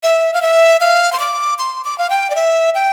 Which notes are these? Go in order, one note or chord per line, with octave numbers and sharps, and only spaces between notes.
E5
F5
E5
F5
C6
D6
C6
D6
F5
G5
D5
E5
G5